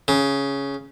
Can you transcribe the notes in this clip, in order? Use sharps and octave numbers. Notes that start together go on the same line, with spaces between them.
C#3